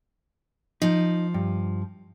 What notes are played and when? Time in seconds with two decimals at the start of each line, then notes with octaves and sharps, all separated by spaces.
0.82 F3 D#4
1.34 G2